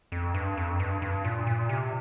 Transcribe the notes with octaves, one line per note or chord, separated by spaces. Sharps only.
F2
G2
F2
G2
G2
A#2
A#2
C3